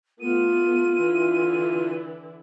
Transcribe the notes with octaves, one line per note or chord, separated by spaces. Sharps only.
A3 B3 F4 D#7
D3 E3 E4